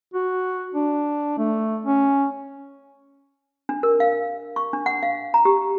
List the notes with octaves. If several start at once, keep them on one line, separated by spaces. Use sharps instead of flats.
F#4
D4
A3
C#4
D4
A#4
F5
C#6
D4
F#5
F5
A#5
G4